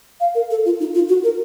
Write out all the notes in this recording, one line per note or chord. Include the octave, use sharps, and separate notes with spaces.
F5
A#4
A4
F4
D#4
F4
F#4
A#4